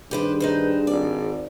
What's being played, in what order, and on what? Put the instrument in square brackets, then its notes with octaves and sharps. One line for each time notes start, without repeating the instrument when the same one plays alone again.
[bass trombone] G2 [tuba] D#3 [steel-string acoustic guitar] G4 B4 C5 [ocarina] G#4
[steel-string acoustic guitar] D#4 B4 C5
[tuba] G#1 [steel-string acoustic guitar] D5